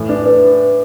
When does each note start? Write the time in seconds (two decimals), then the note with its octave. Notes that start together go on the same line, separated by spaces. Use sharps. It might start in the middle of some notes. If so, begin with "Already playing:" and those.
Already playing: A2 E3
0.09 D4 B4
0.26 B4